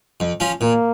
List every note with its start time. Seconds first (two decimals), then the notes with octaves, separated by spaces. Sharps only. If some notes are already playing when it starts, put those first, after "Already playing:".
0.20 F2
0.40 F3 C#4
0.61 A#2 A#3